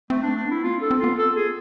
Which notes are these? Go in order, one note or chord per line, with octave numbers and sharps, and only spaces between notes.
A3 C4
D4
A3
D4
B3
E4
C4 F4
D4 A4
C4
B3 F4
A4
G#4